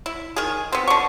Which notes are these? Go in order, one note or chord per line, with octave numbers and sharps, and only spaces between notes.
E4
D#3 G#4
B3 C4
D3 C#6